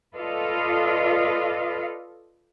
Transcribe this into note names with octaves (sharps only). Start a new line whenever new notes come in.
F4 A4 B4 D5 D#5 F5